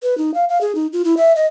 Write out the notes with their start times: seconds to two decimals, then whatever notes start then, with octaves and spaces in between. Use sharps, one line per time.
0.03 B4
0.18 D#4
0.34 F5
0.49 F5
0.61 G#4
0.75 D#4
0.93 F4
1.05 E4
1.17 E5
1.36 D#5